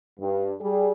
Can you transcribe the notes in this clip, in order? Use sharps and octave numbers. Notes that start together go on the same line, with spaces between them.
G2
G3 G#4